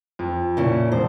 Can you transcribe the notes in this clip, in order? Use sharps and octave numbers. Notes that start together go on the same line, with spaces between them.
F2
A#2 C#3 E4
E1 C5